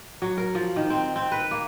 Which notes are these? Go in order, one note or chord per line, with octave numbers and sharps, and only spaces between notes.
F#3
A#4
F3
D#3
C4
C4
B4
A#3